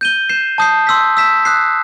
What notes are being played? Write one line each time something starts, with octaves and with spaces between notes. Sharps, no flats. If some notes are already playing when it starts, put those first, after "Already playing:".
G6 D#7 G7
G6 C7 E7
A5 D#6 G6 C7
C6 E6 B6
E6 B6 E7
D#6 F#6 C7